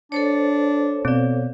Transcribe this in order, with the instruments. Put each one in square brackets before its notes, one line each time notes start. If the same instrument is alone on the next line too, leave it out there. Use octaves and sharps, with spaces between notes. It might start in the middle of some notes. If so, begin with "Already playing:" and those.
[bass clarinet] D4 [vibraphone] A4 C5 C#5
[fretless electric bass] B2 [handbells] C4 D5